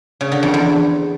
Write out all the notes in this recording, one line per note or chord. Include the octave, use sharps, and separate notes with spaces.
C#3
D3
F2
E2